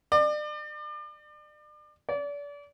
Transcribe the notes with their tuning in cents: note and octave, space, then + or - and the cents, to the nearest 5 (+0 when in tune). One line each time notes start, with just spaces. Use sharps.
D5 +35
D5 -35